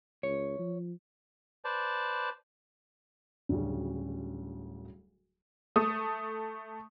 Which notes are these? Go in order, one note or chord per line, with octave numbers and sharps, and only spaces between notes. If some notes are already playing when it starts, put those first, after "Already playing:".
C#2 C#5
F3
B4 C5 D5 A5
D1 D2 C#3 G3 C#4
A3 D#6